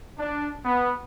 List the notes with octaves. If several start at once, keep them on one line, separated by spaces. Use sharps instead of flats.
D4
B3